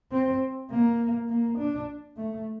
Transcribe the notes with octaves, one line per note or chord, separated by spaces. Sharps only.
C4
A#3
A#3
D4
A3